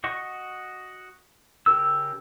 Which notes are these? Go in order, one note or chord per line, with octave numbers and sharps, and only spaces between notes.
F#4 D#5 C#6
C#3 G4 A#4 E6